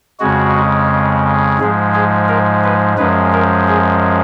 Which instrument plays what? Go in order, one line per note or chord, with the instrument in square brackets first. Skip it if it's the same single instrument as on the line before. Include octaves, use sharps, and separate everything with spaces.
[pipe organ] F2 C#3 G#3 F#4
G#2 F3 G#3 G#4
G#4
A#4
B4
F#2 F3 G#3 B4
A#4
G#4